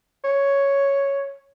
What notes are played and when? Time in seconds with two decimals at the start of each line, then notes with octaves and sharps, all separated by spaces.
0.24 C#5